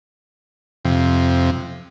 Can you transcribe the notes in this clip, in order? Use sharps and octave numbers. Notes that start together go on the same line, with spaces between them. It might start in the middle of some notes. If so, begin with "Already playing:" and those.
F2 C3